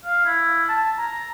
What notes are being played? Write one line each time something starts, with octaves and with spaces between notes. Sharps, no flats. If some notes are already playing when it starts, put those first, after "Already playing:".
F5
E4
A5
A#5